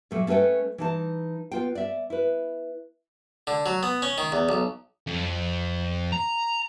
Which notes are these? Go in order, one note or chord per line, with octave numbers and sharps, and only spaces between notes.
A#2 F#3 A3 A#3
A3 C#4 A4 B4 G5
E3 D#4 A5
B3 F4 G5
D5 E5
E4 B4
D3
F#3
B3
C#4
D#3
E2
B1
F2
A#5